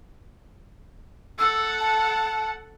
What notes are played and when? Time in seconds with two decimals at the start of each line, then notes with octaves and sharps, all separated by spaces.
1.38 A4 F#5 E6
1.80 A5